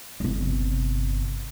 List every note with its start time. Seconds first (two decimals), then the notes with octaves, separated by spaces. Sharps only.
0.20 G1 C3